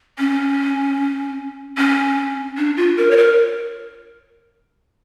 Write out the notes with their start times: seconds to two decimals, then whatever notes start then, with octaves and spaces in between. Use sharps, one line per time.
0.19 C#4
1.78 C#4
2.57 D4
2.77 F4
2.97 A#4
3.11 C#5
3.17 A#4